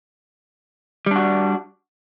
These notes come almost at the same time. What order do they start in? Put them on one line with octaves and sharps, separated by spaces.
G3 D4 F#4